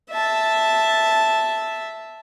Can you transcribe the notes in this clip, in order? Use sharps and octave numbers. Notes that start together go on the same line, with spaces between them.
E5 A5